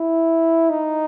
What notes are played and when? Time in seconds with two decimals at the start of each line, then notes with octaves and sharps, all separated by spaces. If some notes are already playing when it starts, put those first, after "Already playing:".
Already playing: E4
0.70 D#4